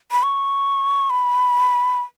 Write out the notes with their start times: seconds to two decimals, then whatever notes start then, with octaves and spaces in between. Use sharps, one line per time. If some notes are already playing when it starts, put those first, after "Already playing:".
0.12 B5
0.23 C#6
1.10 B5